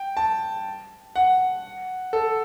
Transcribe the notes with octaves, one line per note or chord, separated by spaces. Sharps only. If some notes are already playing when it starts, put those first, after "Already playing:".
Already playing: G5
A5
F#5
A4